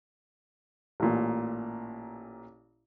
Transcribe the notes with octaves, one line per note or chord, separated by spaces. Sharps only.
A1 A#2